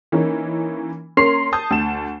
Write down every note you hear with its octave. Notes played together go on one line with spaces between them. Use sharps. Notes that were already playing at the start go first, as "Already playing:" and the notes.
E3 A#3 C#4 D#4
A#3 C#4 A#4 C6 C7 F7
A5 D#6 G6
D2 A5 E7